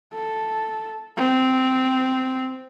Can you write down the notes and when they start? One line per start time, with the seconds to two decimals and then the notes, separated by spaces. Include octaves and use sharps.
0.14 A4
1.17 C4